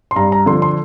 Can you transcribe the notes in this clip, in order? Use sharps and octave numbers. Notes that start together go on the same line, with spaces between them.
C6
G2 A#5
A#5
D3 F3 C6
C6